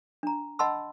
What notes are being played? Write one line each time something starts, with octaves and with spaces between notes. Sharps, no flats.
D4 A#5
D#5 F#5 A5 B5 C6 E6